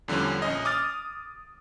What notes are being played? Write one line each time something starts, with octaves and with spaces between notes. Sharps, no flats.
E2 D3 F3 G3 C#4
A#1 C#4 D#5
D6 D#6 F6 A6